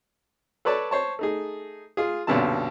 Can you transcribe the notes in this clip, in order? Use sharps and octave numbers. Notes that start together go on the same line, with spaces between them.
A4 B4 C#5 D5 A5
C5 C#5 A5
A3 D#4 G#4
F4 G#4
B1 F#2 A#2 D3 G3 A5